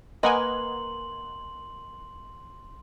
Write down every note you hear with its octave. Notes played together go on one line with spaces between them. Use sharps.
A#3 B4 D#5 F#5 G#5 C6 F#7